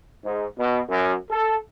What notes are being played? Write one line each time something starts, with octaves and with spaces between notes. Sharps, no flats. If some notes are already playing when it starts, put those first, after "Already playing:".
G#2
B2
F#2
A4